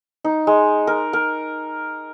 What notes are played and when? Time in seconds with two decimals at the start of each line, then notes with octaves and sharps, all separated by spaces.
0.24 D#4
0.47 G#3
0.87 A#4
1.13 A#4